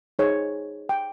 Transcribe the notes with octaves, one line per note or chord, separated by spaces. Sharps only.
D#4 G#4 C5 C#5
G5